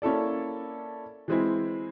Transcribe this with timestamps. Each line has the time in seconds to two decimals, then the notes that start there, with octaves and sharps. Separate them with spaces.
0.02 A#3 C#4 E4 A4 D5
1.28 E3 G#3 C4 E4